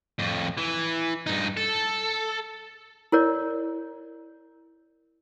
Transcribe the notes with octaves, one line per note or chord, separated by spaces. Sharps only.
F2 A2
E3
G2 D#4
A4
E4 A#4 C#5 D5